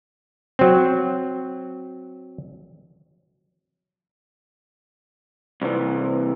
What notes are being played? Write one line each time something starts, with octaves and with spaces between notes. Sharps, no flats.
F#3 C4
C2 E3